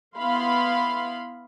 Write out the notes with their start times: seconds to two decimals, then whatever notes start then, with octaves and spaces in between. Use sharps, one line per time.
0.17 B3 E4 F5 B5 C6